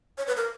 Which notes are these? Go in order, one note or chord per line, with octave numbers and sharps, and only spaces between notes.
C#5
B4
A#4